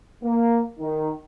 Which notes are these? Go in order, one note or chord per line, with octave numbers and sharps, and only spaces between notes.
A#3
D#3